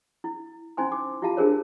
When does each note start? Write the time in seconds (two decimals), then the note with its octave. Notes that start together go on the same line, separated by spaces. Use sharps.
0.24 E4
0.77 C#4 D#4 E4 C5 G#5 C6
0.92 D6
1.22 E4 F4 G4 F5 A5
1.37 D4 G4 G#4 A#4 C5 C#5